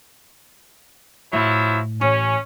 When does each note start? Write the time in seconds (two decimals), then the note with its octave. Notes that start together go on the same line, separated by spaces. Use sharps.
1.33 A2 F3 F#3 E4
2.01 A1 C#4